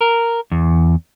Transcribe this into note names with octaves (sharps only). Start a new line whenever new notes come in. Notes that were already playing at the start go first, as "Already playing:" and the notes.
A#4
E2